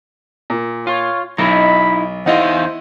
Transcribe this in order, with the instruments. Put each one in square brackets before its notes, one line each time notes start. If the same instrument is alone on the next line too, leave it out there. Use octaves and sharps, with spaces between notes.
[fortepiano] A#2
[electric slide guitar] F4 [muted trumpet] C#5
[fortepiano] B1 [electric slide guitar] D#4 E4 [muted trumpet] B5
[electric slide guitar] E2 D#4 F5 [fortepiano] E4 D#5 F#5 [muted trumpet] C5